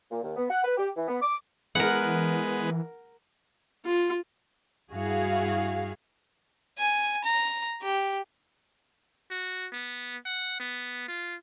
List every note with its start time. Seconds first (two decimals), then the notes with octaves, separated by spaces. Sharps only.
0.11 A#2
0.23 D#2
0.36 B3
0.49 F#5
0.64 B4
0.78 G4
0.96 E3
1.08 B3
1.22 D6
1.75 E3 G#3 B3 A#4 F#5
3.86 F4
4.92 G2 E4 F#4 G#4 F5
6.79 G#5
7.24 A#5
7.83 G4
9.31 F#4
9.73 B3
10.26 F#5
10.60 B3
11.08 F4